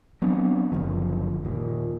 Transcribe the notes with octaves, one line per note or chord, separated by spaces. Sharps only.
F#3 B3 C4 D4
F#1 D3 F3
D#2 A#2